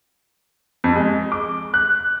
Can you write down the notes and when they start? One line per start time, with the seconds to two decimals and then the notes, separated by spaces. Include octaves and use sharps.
0.84 F2
0.96 G#3
1.32 D6
1.74 F#6